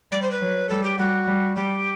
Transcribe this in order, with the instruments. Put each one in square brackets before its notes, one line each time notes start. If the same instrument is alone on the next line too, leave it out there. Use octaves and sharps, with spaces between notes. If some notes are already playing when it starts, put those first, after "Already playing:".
[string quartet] G3 [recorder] D5
[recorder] C5
B4
[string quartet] F#3
[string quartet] G3 [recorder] A4
[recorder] G4
[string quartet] G3 [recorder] F#4
[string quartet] G3
[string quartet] G3 [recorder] G4